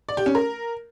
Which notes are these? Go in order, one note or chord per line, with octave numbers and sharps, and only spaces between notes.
D5
G4
C#4
A#4